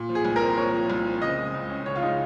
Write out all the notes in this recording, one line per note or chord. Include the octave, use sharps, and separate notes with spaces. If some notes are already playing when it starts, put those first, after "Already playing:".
Already playing: A#2
F3
G#4
C2
A#4
C4
A#2 C#5
F3
C2
C4
C#3 D#5
G#3
C#2
C#4
C#3 C#5
F4
G#3 D#4